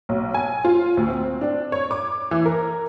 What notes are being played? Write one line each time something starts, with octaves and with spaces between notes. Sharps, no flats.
B1
G#5
F4
D2
C4
D4
C#5
D6
E3
A#4